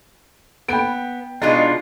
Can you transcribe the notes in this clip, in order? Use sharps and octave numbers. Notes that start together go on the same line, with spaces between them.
B3 G5 D7
B2 G#3 D4 D#4 F4